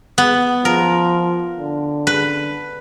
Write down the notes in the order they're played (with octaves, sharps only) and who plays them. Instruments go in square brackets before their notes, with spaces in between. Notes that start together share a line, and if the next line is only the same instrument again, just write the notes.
[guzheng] B3
[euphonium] F3 [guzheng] A#4
[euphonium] D3
[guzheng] B4